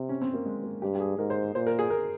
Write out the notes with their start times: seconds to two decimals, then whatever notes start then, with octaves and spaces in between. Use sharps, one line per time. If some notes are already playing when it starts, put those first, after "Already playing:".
Already playing: C3
0.09 C#4
0.22 C4
0.34 A#3
0.46 G#3
0.64 A#3
0.82 G2 G4
0.95 G4
1.00 G#4
1.18 G#2 A#4
1.30 C5
1.54 A#2 C5
1.67 A#4
1.79 G#4
1.90 A#4